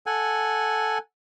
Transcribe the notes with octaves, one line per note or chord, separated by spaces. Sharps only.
A4 F#5 G#5